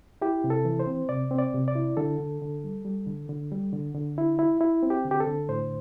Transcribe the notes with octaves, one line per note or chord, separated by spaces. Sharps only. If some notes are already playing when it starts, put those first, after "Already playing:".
E4 G4
C3
A4
E3
C5
C4
C3 D5
C4
D5
C3
D5
E4
D3 A4
D3
D3
G3
G3
D3
D3
G3
D3
D3
E4
E4
E4
C4
G4
D3
G4
A4
D3
A2 C5